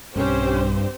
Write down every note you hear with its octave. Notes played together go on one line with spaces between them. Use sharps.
B1 G2 C4 C#4 G4 C5